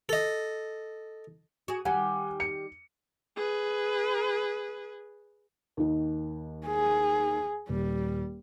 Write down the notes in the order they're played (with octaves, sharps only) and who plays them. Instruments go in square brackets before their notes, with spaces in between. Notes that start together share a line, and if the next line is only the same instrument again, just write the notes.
[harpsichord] A4 D#5
[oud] F#4 G#4
[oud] D#3 G3 [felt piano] F#5 G#5
[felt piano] C#7
[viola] G#4 B4
[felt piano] D#2 D#3
[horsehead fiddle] G#4
[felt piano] D#1 [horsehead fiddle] G3